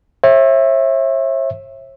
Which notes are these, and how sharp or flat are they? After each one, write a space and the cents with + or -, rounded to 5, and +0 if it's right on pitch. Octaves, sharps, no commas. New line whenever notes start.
C#5 -45 E5 +0